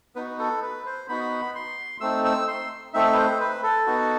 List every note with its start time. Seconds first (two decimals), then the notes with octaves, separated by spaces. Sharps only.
0.16 B3 D#4 F#4 B4
0.39 A4
0.62 B4
0.86 C5
1.09 B3 D#4 F#4 B5
1.55 C6
2.01 A3 C4 D#4 E6
2.25 E6
2.48 C6
2.94 A3 C4 D#4 E5
3.13 B4
3.17 C5
3.40 B4
3.63 A4
3.87 B3 D#4 F#4